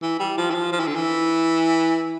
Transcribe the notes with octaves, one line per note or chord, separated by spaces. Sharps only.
E3
G3
F3
E3
F3
F3
E3
D3
E3